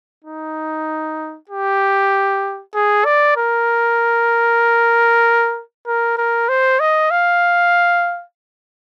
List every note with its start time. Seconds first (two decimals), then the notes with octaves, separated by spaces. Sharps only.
0.25 D#4
1.49 G4
2.75 G#4
3.05 D5
3.37 A#4
5.87 A#4
6.18 A#4
6.49 C5
6.80 D#5
7.11 F5